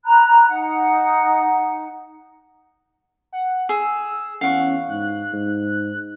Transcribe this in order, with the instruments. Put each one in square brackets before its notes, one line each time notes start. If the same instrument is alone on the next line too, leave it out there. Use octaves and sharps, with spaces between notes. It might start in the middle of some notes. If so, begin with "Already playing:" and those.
[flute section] A#5 B5 F#6
D#4 F#5
[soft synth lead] F#5
[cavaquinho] G#4 [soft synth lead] E6
[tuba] E2 [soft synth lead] C#4 [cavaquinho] F5 F#5 C#6
[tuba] G#2 [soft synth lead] F#6
[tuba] G#2